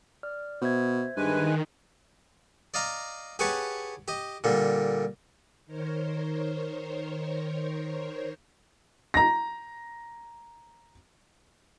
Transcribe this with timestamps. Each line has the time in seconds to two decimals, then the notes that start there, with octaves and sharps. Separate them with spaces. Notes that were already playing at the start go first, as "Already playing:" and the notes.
0.23 D5 F6
0.62 B2 C5 E5 G#6
1.16 G2 D#3 G#3 B4 G#5
2.74 D5 D#5 F5 A#5
3.39 G4 G#4 B4 C#5 F#5 A5
4.08 G4 D#5
4.44 A#2 D3 G3
5.66 D#3 A#4 C5 C#5
9.14 A#5 A#6